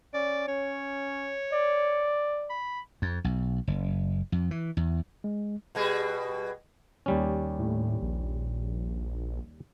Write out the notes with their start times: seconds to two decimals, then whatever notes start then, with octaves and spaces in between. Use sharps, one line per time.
0.14 C#4 D5
0.48 C#4 C#5
1.53 D5
2.50 B5
3.02 F2
3.24 B1
3.67 F#1
4.32 F2
4.51 E3
4.77 E2
5.24 G#3
5.75 B2 G3 G#4
7.06 D#2 G3 C#4
7.59 A2
8.02 A#1